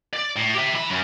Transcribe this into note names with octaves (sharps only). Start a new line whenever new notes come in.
D5
A2
G4 E5
E3 B5
F#2